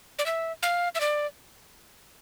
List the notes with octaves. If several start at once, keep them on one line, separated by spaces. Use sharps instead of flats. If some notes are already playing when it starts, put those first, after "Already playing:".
D5
E5
F5
E5
D5